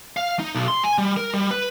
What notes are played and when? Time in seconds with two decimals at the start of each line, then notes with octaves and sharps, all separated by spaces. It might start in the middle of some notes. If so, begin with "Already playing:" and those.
0.17 F5
0.40 D#4
0.54 B1
0.68 C6
0.84 G#5
0.98 G3
1.17 A#4
1.34 G3
1.51 B4